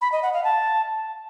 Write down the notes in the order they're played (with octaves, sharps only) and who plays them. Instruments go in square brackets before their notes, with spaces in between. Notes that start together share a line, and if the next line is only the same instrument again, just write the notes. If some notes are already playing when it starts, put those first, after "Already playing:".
[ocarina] B5
D#5
F#5
F5
A5